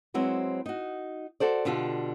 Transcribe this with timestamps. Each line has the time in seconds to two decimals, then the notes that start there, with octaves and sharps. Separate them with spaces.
0.14 F#3 G#3 C4 E4 F#4 B4
0.66 D#4 F#4
1.40 F#4 A4 C5 D5
1.65 B2 D3 F4 G4 A4